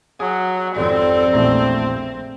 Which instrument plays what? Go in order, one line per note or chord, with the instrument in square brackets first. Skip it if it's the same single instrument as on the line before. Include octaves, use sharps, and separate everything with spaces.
[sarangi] F#3 [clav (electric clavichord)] G#4
[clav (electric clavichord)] G#1 F2 [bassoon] G3 [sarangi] C4 [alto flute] A4
[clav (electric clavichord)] A#1 E2 A#5 [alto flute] A3